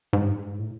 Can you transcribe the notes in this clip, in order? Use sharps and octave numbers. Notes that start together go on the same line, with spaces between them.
G#2
G2
G#2
A2